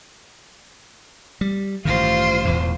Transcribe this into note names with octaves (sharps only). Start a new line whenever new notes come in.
G3
A1 G2 D#3 F4 C5
E1 E2 A2